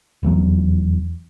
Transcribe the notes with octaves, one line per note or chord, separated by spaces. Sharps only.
F1 E2 E3 F#3